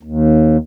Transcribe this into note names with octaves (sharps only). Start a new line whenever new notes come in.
D#2